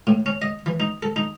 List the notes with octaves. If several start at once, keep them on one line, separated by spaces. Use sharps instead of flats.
A2
C#4
D#5
E3
D#4
A4
D#4